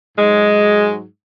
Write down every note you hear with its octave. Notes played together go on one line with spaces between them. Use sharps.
G#2 F#3 G#3